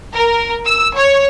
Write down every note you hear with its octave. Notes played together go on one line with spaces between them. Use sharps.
A#4
E6
C#5